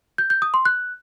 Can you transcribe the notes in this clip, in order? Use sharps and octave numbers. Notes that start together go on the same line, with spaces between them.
G6
G6
D#6
C6
F#6